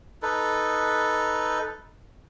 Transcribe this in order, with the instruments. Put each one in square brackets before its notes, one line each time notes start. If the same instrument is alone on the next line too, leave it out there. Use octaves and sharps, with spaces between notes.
[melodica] D#4 A4 B4